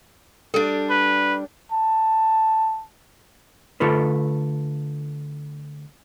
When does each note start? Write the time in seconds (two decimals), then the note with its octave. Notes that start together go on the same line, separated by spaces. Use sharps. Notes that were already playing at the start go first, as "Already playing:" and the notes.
0.54 G3 D4 A4
0.90 B4
1.72 A5
3.80 D3 A3 F4 A4 B4